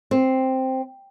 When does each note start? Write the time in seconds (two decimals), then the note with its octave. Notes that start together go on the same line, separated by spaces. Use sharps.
0.11 C4